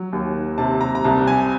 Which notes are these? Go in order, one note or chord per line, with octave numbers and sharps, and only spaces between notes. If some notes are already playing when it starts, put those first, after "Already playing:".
Already playing: F#3
D#2
C3 A5
A#5
A#5
C2 A5
G#5